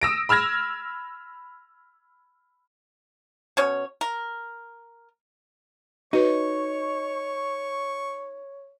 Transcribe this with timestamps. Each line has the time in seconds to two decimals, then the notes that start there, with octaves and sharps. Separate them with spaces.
0.02 D#6 E6 A#6 D7
0.29 B5 E6 F6 G#6 A#6
3.57 B2 C#4 C#5
4.01 A#4
6.13 D#4 F#4 B4 C#5 C#6